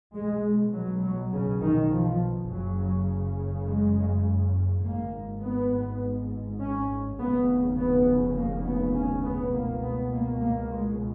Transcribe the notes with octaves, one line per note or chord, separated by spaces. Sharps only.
B1 B2 G#3
F#3
F#3
C#3
D#3
F3
F#1 F#2 C#3 F#3
G#3
G#1 G#2 A#3
B3
C#4
F1 D#2 C#3 B3
B3
A#3
B3
C#4
B3
C#2 B2 A#3
B3
A#3
A#3
G#3